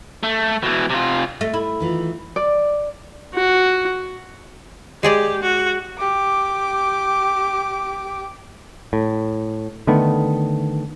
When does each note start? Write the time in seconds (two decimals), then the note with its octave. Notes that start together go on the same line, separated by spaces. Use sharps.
0.23 A3
0.63 B2 E3
0.90 C3 F4
1.41 A3
1.54 E4
1.80 D#3 E3 F4
2.36 D5
3.34 F#4
5.03 G#3 G4 G#4 D5
5.42 F#4
5.98 G4 D6
8.93 A2
9.87 D3 D#3 A3 B3